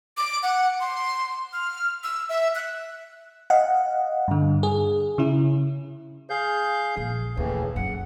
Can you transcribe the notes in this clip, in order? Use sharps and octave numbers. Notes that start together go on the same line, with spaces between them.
D6
F#5
C6
F6
E6
E5
F#6
D#5 F5 F#5
G2 D3
G#4
C#3 C#4 E4
G#4 F5 G6
A#1
D#2 A2 C#3 E3
F#2 F#5